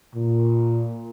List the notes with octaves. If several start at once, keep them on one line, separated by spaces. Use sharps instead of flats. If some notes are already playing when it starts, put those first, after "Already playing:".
A#2